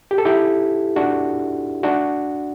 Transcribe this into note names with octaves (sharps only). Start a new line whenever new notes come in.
G4
A4
E4 G4
D4 F#4
D4 F#4